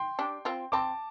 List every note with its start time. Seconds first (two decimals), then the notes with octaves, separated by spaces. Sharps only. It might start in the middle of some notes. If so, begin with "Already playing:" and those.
Already playing: G5 C6
0.19 D4 G4
0.45 C4 F4
0.72 C4 A5 D6